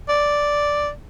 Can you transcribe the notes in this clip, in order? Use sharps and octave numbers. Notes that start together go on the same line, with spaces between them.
D5